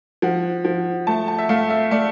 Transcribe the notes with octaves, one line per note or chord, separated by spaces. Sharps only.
F3 F#5
F3
A3 A5
A5
E5
A3 F5
E5
A3 D5